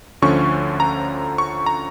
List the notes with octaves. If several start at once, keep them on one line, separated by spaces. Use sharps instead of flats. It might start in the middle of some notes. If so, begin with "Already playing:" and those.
D2 D3 F3 C#4 C#6
A#5
C#6
A#5